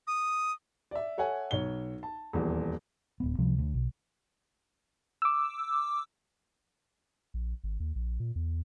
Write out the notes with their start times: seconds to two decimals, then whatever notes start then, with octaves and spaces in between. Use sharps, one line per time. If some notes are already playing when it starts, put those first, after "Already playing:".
0.07 D#6
0.91 D5 E5
1.18 A4 C#5 E5 F#5 G#5
1.51 B1 C#5 G7
2.03 A5
2.33 D#1 E2
3.20 D1 B3
3.39 C#2 C3 F3 G3
3.59 D2
3.74 B1
5.22 D6 E6
7.34 A#1
7.64 G#1
7.80 D#2
7.95 A#1
8.20 A#2
8.36 E2